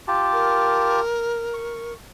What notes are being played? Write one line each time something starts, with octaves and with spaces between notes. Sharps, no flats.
F4 G4 A5
A#4
C#6